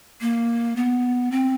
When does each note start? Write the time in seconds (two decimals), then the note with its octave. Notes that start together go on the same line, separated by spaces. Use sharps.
0.21 A#3
0.76 B3
1.31 C4